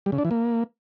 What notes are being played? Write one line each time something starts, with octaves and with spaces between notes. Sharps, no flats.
G3
C#3
D4
E3
A#3